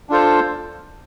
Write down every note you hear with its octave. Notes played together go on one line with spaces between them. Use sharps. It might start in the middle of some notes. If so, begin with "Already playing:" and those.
D4 F4 A4 C5